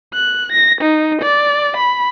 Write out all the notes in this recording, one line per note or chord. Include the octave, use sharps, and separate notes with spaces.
F#6
A#6
D#4
D5
B5